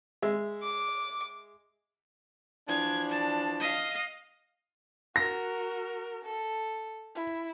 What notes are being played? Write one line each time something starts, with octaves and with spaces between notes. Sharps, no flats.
G#3 E5
D6
E3 F3 D4 G#6
A5
D#5 F5
F#4 A#4 A#6
A4
E4